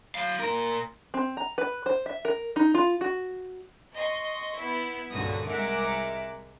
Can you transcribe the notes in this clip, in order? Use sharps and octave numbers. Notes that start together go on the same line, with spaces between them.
F#3 F5
A#2 A#4
C4
A#5
B4
C5
E5
A#4
D#4
F4
F#4
D#5 C6 C#6
B3 E4
C#2 G2 A#2 D3 F#4 D#6
C2 G#3 A#4 E5 F#5 D6